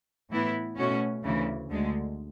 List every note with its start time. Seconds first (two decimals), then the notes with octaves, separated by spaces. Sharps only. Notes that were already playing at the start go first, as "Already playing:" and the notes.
0.31 A2 E3 B3 E4
0.77 B2 A3 C#4 F#4
1.23 D2 C#3 E3
1.70 D2 D3 G#3